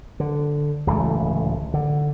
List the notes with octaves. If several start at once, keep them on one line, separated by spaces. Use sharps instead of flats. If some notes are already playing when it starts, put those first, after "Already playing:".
D3
D1 C#2 E3 A3
D3